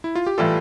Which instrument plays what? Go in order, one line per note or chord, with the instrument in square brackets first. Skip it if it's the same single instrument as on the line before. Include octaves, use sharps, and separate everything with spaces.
[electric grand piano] E4
F4
G4
[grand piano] A2 E3 G3 [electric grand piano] F4 A4